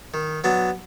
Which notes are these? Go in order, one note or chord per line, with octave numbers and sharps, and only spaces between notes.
D#3
F#3 B3 D4